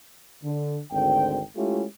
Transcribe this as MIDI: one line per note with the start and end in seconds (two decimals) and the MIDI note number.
0.43 0.79 50
0.92 1.40 32
0.92 1.40 38
0.92 1.40 50
0.92 1.40 60
0.92 1.40 79
1.56 1.84 56
1.56 1.84 57
1.56 1.84 61
1.56 1.84 64
1.56 1.84 65
1.56 1.84 67